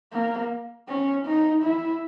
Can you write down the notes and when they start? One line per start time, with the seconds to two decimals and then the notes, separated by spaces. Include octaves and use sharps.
0.12 A#3
0.88 C#4
1.26 D#4
1.63 E4